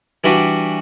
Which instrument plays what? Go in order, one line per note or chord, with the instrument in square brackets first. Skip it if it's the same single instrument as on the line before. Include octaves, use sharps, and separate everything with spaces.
[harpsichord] E3 G3 D4 F#4 B4